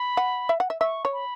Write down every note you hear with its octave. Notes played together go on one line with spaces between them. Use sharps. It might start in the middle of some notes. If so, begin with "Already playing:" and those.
Already playing: B5
F#5
E5
F#5
E5
E5 C#6
C#5
B5